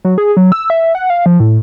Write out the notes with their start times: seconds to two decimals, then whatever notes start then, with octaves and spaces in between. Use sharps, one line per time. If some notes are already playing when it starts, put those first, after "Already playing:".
0.05 F#3
0.18 G#4
0.37 F#3
0.52 E6
0.70 E5
0.95 F#5
1.10 F5
1.26 F3
1.40 A2